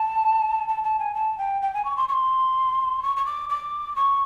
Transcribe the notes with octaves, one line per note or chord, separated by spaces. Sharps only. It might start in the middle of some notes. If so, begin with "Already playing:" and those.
Already playing: A5
A5
A5
G#5
A5
G5
G5
G#5
C#6
C6
C#6
C6
C#6
C#6
D6
D6
C#6